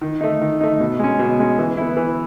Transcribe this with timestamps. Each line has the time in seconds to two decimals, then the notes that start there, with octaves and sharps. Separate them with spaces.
0.01 D#3
0.21 A3 D#4
0.41 D#3
0.61 A3 D#4
0.80 B2
0.99 G#3 C#4
1.19 B2
1.39 G#3 C#4
1.59 E3
1.77 B3 E4
1.97 E3